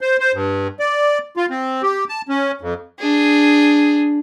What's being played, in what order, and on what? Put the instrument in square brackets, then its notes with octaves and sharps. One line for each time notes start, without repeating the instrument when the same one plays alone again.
[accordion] C5
C5
G2
D5
F4
C4
G4
A5
C#4
F2
[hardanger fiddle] D4 G#4